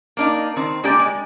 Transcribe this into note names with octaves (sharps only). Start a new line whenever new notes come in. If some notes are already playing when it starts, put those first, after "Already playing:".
A#3 D4 D#4
D#3 C4
G#3 A#3 D4 G4 D5
G#3